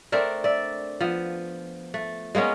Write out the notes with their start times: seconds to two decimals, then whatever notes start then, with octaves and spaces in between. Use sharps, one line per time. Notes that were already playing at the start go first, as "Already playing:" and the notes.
0.12 A3 C4 D4 A#4
0.44 D5 E5
1.01 F3 B3
1.94 A3
2.35 G#3 A#3 B3 C#4